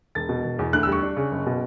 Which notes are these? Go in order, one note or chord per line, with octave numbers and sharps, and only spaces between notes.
E1 A6
B2
E1
E2
D2 F#6
E6
G3 C#6
D4
C#3
F#1
B2